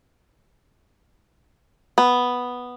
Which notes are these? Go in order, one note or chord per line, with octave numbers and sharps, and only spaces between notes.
B3